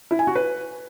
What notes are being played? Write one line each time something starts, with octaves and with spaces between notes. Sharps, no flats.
E4
G#5
F#4
B4